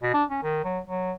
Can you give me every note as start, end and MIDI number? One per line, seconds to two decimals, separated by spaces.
0.03 0.12 47
0.14 0.24 62
0.30 0.43 61
0.43 0.62 51
0.64 0.79 54
0.88 1.12 54